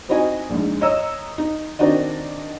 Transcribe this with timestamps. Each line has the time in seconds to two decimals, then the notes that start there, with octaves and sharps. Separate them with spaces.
0.09 C4 D#4 E4 F#4 D#5 G#5
0.50 A#1 G#2
0.81 C#5 D#5 A#5 E6
1.38 D#4
1.79 D#3 C4 D4 D#4 F#4 D#5